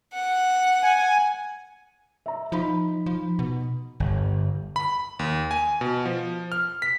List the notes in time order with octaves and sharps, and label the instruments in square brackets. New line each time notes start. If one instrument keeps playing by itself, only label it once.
[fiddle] F#5
[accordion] G#5
[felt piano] E5 A#5
[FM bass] F3 [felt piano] D#4 B5
[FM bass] F3
B2
[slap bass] G1
[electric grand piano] B5
D#2
G#5
B2
F3
F6
B6